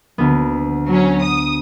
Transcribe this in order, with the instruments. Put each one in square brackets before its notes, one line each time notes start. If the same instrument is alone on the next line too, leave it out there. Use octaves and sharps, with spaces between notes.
[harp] D2 B3
[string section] F#3 C#4
D#6